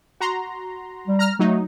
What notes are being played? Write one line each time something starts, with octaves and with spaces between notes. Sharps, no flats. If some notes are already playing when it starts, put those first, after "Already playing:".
F#4 A#5 C6
G3
A#5 F6
F#3 A3 D#4